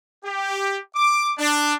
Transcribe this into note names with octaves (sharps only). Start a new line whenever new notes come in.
G4
D6
D4